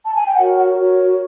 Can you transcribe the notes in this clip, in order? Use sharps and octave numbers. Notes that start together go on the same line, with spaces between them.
A5
G#5
G5
F#4 A#4 C#5 F#5
F#5
F#4 A#4 C#5